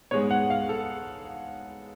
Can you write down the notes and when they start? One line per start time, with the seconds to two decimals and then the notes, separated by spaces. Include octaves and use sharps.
0.11 G#2 G#3 B3 C#5
0.31 F#5
0.50 F5
0.69 A4